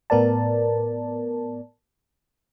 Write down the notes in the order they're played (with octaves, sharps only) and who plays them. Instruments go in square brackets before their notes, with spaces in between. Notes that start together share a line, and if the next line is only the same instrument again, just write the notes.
[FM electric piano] A2 B3 A#4 D5 A5